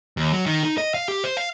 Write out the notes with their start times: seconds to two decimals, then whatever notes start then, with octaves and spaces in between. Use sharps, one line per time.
0.17 D#2
0.33 F#3
0.46 D#3
0.63 D#4
0.78 D#5
0.94 F5
1.08 G4
1.24 C5
1.37 F5